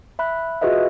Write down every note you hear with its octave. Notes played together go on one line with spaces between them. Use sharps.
E5 B5 F#6
F4 F#4 G#4 B4 D#5 E5